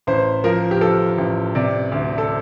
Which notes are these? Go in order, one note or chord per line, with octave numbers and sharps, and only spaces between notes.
A1 C5
F3 A#4
G4
F3 A4
A1
C3 D5
D2
A4